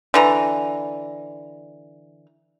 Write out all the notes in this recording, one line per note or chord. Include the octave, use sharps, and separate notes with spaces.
D3 E3 A#5